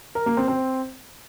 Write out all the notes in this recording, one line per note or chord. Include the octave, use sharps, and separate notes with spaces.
A#4
A#3
C4
C4